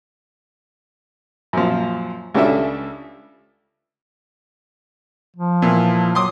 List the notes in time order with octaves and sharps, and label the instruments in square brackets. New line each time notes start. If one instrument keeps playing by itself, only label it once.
[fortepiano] F#2 A#2 F3
C#2 C#3 G3 D4 A4 E5
[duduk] F3
[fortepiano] A#2 E3
[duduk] F#3 [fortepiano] C6 D6 D#6